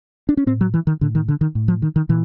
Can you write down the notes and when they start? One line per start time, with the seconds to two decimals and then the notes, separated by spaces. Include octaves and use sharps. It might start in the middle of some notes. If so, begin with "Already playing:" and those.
0.29 D4
0.37 C#4
0.46 A2 C4
0.61 F#3
0.74 E3
0.87 D#3
1.01 A2 D3
1.15 D#3
1.28 D3
1.41 D#3
1.55 A2
1.68 F3
1.82 D#3
1.96 D#3
2.09 A#2 E3